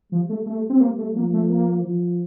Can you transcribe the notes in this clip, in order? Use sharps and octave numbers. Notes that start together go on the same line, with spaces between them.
F3 G3
A3
A3
C4
A#3
A3
F3 A#3
A3
A#3
F3